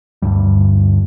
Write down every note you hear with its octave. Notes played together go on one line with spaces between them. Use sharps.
D2 G2 G3